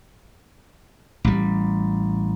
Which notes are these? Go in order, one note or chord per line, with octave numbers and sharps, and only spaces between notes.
A1 G3